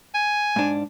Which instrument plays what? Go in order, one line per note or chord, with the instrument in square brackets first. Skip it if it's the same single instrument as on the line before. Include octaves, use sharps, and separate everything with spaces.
[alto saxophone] G#5
[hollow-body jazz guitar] G#2 D4